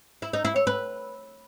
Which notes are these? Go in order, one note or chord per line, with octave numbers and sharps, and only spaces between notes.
E4
D#4
E4
C#5
B4